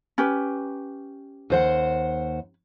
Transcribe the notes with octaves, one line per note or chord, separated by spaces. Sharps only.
C#4 G4 B4
D#2 C5 F#5